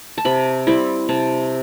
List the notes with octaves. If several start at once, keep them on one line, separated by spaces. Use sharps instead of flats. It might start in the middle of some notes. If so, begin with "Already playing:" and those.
A5
C3 B5
G3 C4 E4 B5
C3 A5